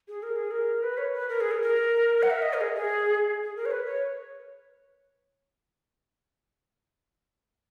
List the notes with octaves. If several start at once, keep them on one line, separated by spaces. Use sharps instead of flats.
G#4
A#4
G#4
A#4
B4
C#5
B4
A#4
G#4
A#4
A#4
F#5
E5
D#5
A#4
G#4
G#4
G#4
A#4
C#5
B4
C#5